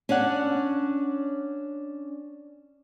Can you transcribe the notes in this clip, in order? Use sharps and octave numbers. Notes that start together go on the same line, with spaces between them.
C#4 D4 D5 F#5